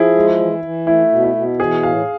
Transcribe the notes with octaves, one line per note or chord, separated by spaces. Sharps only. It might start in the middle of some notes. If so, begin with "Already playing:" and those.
Already playing: F3 E4 G#4
G#3
E3
E3
A3 E4
B2
E4
B2
E3 G#4
A2 F5